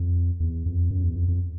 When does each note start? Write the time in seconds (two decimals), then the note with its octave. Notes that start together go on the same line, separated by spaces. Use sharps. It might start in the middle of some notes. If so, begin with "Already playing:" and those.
Already playing: F2
0.40 E2
0.66 F2
0.91 F#2
1.03 E2
1.16 F2
1.28 F2